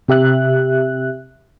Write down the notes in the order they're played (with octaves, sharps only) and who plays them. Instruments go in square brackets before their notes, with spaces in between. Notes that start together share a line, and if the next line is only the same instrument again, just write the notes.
[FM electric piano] C3 G4 E5 F#6